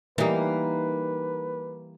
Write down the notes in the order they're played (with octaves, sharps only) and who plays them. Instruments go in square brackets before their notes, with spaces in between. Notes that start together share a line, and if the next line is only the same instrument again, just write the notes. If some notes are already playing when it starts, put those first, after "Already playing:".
[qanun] E3 G3 [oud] A#3 D#4 [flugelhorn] B4